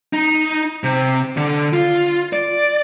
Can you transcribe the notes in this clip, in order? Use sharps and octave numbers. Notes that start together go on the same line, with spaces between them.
D#4
C3
D3
F4
D5